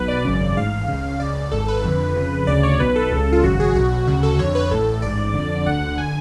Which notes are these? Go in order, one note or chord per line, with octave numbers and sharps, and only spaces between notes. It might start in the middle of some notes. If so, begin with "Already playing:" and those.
Already playing: B1 B2 B4
D5
G#1 F#2 C#3
A1 G#2 F5
C#2 C#3
C#2 C#3 D5
G#1 G#2 A4
B4
F2 D3
F2 C#3
D2 C#3 D5
C#5
B1 B2 B4
A4
C#2 C#3
F4
G#1 F#2 C#3 F#4
G#4
B1 B2 F#4
D2 C#3 F#4
A4
F2 D3 C#5
B4
A1 A2 A4
A4
A1 G#2 D5
F2 D3
D2 D3 F#5
D3 G#5